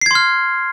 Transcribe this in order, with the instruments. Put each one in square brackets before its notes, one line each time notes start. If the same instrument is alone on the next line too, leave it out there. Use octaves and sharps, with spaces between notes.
[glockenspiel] C7
G#6
C6
F6